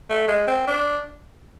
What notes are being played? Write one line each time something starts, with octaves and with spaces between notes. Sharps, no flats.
A3
G#3
C4
D4